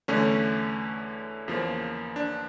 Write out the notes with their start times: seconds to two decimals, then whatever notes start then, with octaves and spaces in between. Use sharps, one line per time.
0.08 E2 D3 A3 C#4
1.48 E2 C#3 F3 A#3
2.16 D4